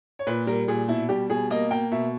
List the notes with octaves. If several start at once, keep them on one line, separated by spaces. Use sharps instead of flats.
C#5
A#2 B4
G3 A#4
A#2 G#4
B2 E4
G3 G4
B2 G#4
A#3 D#5
A#3 G5
B2 E5